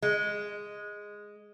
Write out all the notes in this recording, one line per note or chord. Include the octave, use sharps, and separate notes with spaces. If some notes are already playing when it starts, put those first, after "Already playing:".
G#3